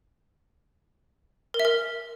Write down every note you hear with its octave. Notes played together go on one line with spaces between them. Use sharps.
A#4
E5
A#4